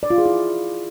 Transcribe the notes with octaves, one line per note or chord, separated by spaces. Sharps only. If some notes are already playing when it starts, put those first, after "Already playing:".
D5
F4
G#4
E4